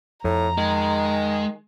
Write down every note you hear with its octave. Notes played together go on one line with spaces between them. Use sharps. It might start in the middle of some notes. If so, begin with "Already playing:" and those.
F2 A2 A#5
D#3 G#3